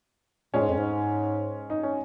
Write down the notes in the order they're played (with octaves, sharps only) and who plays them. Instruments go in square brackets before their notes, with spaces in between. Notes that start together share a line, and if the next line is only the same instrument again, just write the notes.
[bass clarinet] A#2 [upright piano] G#3 C#4
[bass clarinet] G#2
F2
G#2
[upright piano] D#4
C#4